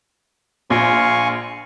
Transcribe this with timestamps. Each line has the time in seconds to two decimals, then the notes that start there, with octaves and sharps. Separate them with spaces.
0.70 A#1 F5 G#5 C#6